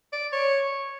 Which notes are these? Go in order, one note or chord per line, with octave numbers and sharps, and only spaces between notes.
D5
C#5